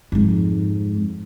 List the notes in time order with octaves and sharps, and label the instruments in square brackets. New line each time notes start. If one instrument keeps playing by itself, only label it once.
[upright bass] F2 G#2